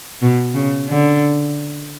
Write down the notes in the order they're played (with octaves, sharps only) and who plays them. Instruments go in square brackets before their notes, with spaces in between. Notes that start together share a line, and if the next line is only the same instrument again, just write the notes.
[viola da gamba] B2
C#3
D3